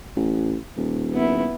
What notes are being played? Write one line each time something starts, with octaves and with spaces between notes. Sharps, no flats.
A1
D#1
B3 E4